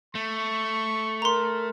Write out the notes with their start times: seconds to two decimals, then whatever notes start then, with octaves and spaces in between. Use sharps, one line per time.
0.15 A3 C#6
1.22 A#4 A#5 C6